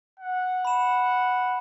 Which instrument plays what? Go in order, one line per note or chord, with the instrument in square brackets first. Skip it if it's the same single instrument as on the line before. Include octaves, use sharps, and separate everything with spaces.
[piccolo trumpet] F#5
[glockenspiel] B5 E7